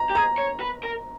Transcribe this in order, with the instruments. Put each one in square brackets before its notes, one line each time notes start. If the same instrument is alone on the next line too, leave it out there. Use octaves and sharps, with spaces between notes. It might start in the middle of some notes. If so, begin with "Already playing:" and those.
Already playing: [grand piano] A#5
[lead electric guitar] G4
[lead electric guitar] G#4 [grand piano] A#5
[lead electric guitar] C#5
B4
A#4